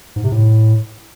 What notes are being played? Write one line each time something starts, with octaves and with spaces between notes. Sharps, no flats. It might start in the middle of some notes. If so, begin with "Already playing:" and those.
G#2
C3
A2